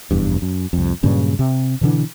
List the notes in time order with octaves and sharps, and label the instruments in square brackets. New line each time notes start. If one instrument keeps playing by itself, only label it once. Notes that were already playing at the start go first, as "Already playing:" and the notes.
[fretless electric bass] F1 E2 G2
F#2
C2 F2
G2 A#2 C#3 F#3
C3
B2 D3 E3 D4